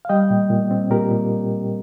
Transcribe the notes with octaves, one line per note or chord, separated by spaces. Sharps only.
F5
G3 D#5 G5
A#2
A#2
C4
A#2 G4 A#4
A#2